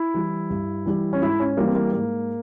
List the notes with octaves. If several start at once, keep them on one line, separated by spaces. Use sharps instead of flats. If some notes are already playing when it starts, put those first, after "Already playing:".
Already playing: E4
E3 G3
G2
E3 G3
C#4
G#2 E4
C#4
E3 G3 A#3
C4
A#3
G#2 A#3